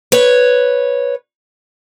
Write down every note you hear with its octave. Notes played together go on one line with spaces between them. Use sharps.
B4 C#5